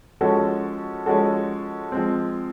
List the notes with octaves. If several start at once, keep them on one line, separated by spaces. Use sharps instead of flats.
F3 G#3 C#4 F#4 A4
F3 G#3 C#4 F#4 A4
F3 G#3 C4